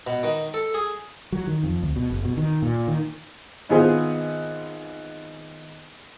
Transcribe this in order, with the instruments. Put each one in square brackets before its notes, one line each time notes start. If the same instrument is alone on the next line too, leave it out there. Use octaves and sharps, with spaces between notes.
[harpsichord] B2
D#3
A4
G#4
[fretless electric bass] F#3
D#3
F2
D2
B2
F#1
B2
D#3
A#2
D#3
[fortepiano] G#1 B3 F4 G#4 C5